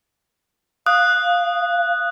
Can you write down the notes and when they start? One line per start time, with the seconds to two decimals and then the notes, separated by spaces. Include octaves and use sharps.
0.86 F5 D#6 F#6